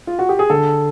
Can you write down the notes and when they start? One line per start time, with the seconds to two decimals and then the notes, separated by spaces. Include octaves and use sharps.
0.07 F4
0.19 F#4
0.29 G4
0.39 G#4
0.50 D3 A4